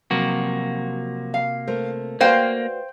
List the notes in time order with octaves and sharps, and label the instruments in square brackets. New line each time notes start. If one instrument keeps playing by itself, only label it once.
[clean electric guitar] C3 A#3 F#4 [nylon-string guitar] F3 F#3
[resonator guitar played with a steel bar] F5
[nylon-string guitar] A3 A#4 C5
[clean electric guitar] A#3 [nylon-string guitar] F#4 B4 D5 [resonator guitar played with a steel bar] C5 F5 G5